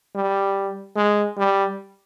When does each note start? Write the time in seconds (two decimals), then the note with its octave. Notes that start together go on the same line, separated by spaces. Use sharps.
0.15 G3
0.96 G#3
1.37 G3